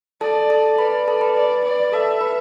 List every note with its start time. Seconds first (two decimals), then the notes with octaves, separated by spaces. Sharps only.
0.21 A4 D5 A5
0.50 A4 A5
0.78 B4 D5 B5
1.08 A4 A5
1.21 B4 B5
1.36 D5
1.65 D5
1.92 A4 E5 A5
2.21 B4 B5